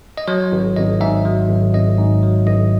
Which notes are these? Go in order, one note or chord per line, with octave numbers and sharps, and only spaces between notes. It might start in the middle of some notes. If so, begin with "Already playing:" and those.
D#5
F#3 C#5
G#1
G#1 D#5
G#2 E5
F#3
G#1
G#1 D#5
G#2
F#3
G#1 D#5